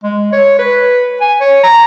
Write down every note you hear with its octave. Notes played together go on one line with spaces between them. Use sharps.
G#3
C#5
B4
G#5
C#5
A#5